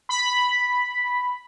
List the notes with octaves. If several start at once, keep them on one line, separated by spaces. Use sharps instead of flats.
B5